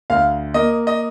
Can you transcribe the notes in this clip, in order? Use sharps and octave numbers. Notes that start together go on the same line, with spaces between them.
D2 F5
A#3 D#5
D#5